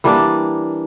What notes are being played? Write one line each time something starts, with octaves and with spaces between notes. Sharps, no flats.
E3 G3 A#3 D4